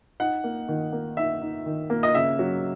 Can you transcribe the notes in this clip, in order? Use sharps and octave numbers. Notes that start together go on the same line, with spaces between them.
D#4 F#5
A#3
D#3
A#3
D#4 E5
D#4
D#3
A#3
D#5
C#3 E5
F#3